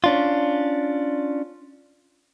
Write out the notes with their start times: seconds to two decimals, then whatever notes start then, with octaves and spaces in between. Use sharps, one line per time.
0.04 C#4 D4 F4